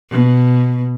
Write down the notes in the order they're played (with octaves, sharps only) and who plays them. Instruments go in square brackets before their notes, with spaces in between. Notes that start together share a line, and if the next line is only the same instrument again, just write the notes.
[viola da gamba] B2